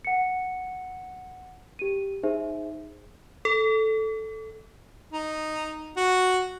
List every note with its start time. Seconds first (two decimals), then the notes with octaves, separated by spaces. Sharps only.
0.05 F#5 C#7
1.79 G4 D#7
2.23 D#4 G#4 C5 E5
3.45 A4
5.13 D#4
5.97 F#4